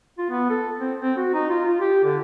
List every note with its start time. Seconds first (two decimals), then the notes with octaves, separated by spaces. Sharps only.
0.18 F4
0.30 B3
0.50 A4
0.79 C4
1.01 C4
1.17 F#4
1.34 D#4
1.50 F4
1.65 F4
1.81 G4
2.04 D3